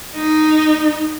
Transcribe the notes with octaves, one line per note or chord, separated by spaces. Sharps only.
D#4